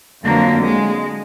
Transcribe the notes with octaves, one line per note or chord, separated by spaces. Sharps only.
F2 D3 F#3 A#3
G#3